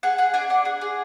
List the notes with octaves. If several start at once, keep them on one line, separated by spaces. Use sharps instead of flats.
G#4 F#5
G#4 F#5
D4 G#5
D4 F#5
G#4
G#4